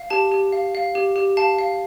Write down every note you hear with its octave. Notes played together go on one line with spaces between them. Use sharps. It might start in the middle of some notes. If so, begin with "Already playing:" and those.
Already playing: F5
G4 A5
G4
F5
F5
G4
G4
F5 A5
F5